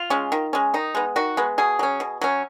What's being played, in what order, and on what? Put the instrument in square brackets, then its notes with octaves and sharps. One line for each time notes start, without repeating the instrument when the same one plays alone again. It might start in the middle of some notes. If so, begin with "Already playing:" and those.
Already playing: [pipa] F4
G#3 C#4
D#3
G#3 C#4
D#3 D#4
G#3 B3
D#3 F#4
G#3 B3
B2 G#4
F#3 C#4
B2
F#3 C#4